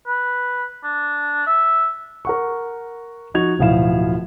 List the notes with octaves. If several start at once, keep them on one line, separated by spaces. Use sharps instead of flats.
B4
D4
E5
A#4 F#5 C#6
F3 D#4 F#4 G#6 F7
D1 B2 F3 E4 F5 E7